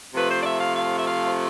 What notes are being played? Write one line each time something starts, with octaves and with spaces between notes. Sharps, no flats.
C3 F3 A3 B4
C5
D5
E5
F5
F5
E5
F5